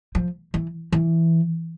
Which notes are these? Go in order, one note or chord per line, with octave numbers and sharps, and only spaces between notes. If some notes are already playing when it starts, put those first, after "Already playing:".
F3
E3
E3